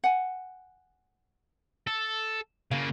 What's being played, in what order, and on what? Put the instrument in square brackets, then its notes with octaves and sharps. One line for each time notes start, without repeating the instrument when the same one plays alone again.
[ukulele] F#5 G#5
[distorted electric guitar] A4
[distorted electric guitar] C#3 A#3 [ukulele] F5